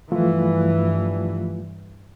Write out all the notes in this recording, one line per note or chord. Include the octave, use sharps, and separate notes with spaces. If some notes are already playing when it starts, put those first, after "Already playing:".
G2 E3 F3 A3 F4